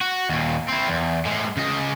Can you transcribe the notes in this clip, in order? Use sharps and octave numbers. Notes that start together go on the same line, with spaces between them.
F#4
D#2 A#2
C4 E4
E2
A2 G#3
C#3 D#5